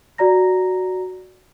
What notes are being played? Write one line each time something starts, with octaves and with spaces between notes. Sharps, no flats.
F#4 D5 A#5 A#6